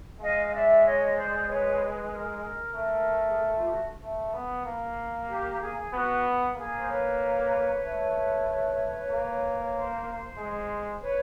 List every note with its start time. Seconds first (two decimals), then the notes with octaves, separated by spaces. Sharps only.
0.21 G#3 D#5 F5
0.45 D#5
0.53 D5 E5
0.84 C#5 D#5
1.16 C5 D5
1.48 B4 C#5
1.71 C5
1.80 B4
2.12 A#4
2.75 A3
3.27 G#4
3.39 A4
3.55 F4
3.63 G4
3.71 F#4
4.03 A3
4.34 B3
4.66 A#3
5.29 G4
5.61 G#4
5.93 B3 F#4
6.57 A#3 G#4
6.77 C5
6.88 B4 C#5
7.84 A3
8.47 B4 C#5
9.10 A#3
9.74 C5
10.38 G#3
11.01 B4 C#5